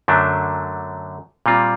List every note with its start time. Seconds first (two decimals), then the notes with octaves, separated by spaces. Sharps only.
0.08 F#2 D3 F#3 A3 D4
1.46 A#2 G3 C4 F4